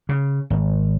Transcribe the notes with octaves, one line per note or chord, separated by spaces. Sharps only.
C#3
G#1